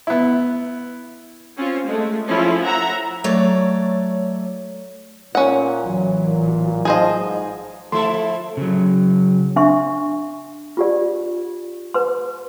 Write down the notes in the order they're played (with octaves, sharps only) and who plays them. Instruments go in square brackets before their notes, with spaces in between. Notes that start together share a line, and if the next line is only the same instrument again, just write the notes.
[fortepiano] B3 E4
[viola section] C4 C#4 F4
G#3 A3
F3 C#4 E4 F4
E5 F#5 A#5
[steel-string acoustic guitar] F#3 A3 C#5 D5
[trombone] A#2 [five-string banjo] C#4 F#5
[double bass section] A1 E3 F#3
[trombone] A#2
[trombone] F3 [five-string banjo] G#4 C5 D#5
[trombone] G#2
[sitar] F3 E4 A4 [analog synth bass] A3 [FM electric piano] C6
[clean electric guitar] C#3 F#3
[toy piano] D4 E5 C6 C#6
F4 G4 D5
B4 C6